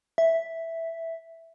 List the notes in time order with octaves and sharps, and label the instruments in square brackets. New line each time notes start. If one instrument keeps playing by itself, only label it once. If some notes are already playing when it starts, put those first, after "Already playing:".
[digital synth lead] E5